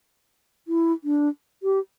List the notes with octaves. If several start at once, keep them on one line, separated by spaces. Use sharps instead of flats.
E4
D4
G4